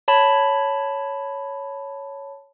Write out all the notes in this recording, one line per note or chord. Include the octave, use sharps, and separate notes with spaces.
C#5 A5 B5